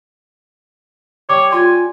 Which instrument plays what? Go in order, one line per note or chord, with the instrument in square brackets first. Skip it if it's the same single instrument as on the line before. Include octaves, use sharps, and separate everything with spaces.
[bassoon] G3 [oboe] C#5 [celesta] D6
[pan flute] F4 [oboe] G#5 [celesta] C6